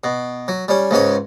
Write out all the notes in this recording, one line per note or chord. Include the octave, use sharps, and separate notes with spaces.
B2
F#3
G3 C#4
C#2 G#2 G#3 C#5